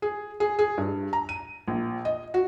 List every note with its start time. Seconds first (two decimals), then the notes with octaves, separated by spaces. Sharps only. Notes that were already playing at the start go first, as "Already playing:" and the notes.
0.02 G#4
0.40 G#4
0.59 G#4
0.78 G2
1.13 A#5
1.29 D#7
1.68 A#1
2.05 D#5
2.34 F#4